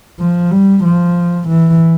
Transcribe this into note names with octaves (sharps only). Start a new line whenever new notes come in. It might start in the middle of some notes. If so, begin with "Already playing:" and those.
F3
G3
F3
E3